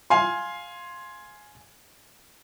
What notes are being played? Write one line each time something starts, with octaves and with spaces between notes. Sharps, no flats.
F5 G#5 C6